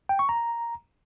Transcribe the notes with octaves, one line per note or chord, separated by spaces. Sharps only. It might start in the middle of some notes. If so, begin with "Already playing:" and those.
G5
C#6
A#5